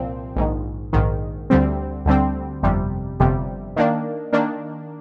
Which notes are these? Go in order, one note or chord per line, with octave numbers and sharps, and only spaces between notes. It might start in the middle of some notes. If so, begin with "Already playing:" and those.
Already playing: C2 A#2 F3 C4
A#1 G#2 D#3
A#1 G#2 D#3
D2 D3 G3 C4
D2 D3 G3 C4
G1 F2 C3 G3
G1 F2 C3 G3
D#3 A#3 D4
D#3 A#3 D4